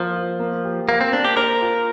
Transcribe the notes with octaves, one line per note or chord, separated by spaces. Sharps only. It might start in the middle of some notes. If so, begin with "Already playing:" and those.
Already playing: F3 A#3 A#4
F4
A#3
G4
A#3 F5
C4
A#3 D4
G4
A#4 C5
F4